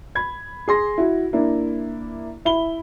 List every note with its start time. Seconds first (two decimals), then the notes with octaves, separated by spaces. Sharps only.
0.15 B5 G#6
0.68 G#4 C6 A#6
0.98 E4 F#4
1.33 A#3 D4 E4
2.45 E4 E5 B5 G7